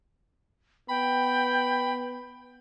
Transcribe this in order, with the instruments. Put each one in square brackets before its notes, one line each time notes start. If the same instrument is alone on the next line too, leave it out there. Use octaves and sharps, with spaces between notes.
[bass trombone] B3 [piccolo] G5 [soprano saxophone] B5